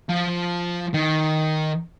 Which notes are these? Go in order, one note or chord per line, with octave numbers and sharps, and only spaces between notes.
F3
D#3